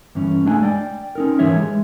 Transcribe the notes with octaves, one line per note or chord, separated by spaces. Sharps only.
G2 E3 C#4
G#3 A3 D4 G5 G#5
D5 G5
C#4 D#4 A#4
G#2 E3 G#3 G4 C#5 E5
G#3